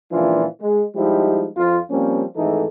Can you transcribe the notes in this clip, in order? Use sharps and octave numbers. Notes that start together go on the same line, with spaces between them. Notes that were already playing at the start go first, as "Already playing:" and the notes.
C#2 A#2 E3 F3 D4 F4
G#3
F3 G3 G#3 D#4 E4 G4
F2 F4
F3 G3 A#3 C4 C#4
G#1 G#2 E3 A3 D#4 A4